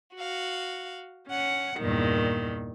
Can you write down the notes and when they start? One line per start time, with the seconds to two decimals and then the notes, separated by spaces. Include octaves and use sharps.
0.14 F#4 F5
1.27 C#4 F#5
1.77 E2 G2 A#2 D#3